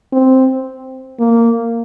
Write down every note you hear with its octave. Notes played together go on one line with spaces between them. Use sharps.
C4
A#3